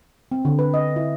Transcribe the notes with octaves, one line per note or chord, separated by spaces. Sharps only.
C4
D3
B4
D#5
E4